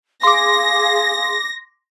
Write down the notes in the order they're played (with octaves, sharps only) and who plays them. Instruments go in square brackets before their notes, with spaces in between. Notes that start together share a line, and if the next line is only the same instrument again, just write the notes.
[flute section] G#4 F5 [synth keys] C6 D6 [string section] A#6